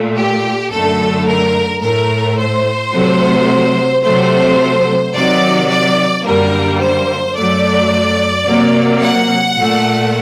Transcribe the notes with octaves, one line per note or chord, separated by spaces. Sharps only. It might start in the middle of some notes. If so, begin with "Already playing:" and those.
Already playing: A#2 A3
G4
F#2 D3 A3 A4
A#4
A2 A3 A#4
C5
C3 F#3 A3
C3 F#3 A3 C5
C3 D#3 F#3 D5
D5
F#2 D3 G3 A#3 A#4
C5
F#2 F#3 A3 D5
C3 F#3 A#3
F#5
A#2 A3